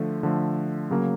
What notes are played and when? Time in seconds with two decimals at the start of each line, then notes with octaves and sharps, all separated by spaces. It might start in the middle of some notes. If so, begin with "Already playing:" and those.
Already playing: D3 F3 A3
0.23 D3 F3 A3
0.90 C#3 F#3 A#3